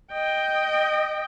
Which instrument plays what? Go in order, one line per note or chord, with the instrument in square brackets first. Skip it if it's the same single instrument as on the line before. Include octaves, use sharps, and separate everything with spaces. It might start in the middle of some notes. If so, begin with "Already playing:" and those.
[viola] D#5 G5